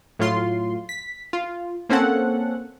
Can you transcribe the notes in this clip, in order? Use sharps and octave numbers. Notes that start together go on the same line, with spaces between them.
A2 F#3 F4 C6
B6
F4
A#3 C4 C#4 A4 F#5